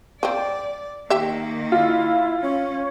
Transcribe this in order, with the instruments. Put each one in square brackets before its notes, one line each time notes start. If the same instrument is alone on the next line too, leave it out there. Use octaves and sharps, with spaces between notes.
[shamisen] F3 C4 [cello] D5
[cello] D#3 A#3 [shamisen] G4 E5
[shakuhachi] E4 [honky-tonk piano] F4
[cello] C#4 [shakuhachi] C#5